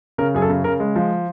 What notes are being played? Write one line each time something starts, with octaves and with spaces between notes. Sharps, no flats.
C#3 A#4
F#2 G#4
A4
C#3
C#3 A#4
G#3
F3